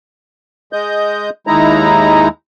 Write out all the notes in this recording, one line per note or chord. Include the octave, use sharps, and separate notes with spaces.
G#3 D#5 G6
D#2 G#3 D#4 E4 A#5